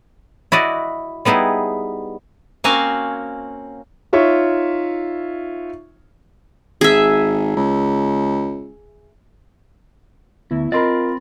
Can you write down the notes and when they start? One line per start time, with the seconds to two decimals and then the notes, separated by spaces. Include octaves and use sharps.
0.52 E4 F#4 D5 D#5
1.25 G3 B3 D#4 E4 G#4
2.64 A#3 C4 C#4 F#4 F5 G#5
4.13 D#4 F4 C#5 E5 C#6
6.81 G#1 G#4 E5
7.56 C#2
10.51 D2 B3 E4
10.72 C4 F4 A#4 D#5 B5 C6 A6